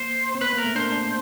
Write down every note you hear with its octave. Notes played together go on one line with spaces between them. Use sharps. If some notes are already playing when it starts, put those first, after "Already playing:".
Already playing: A#3 C5
C4
B3 B4
A#3
A#4
A3
D4 C5
D4